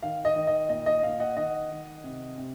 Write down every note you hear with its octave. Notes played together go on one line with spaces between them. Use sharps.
D#3 F5
D#5
D#3
D#5
A#2 D#5
D#5
A#2 F5
D#5 F#5
D#3 D#5 F#5
D#3
C3
C3